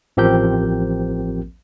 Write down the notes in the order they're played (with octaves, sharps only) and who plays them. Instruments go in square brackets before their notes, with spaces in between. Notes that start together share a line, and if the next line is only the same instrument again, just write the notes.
[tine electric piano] A1 F3 C4 G4 A#4 G6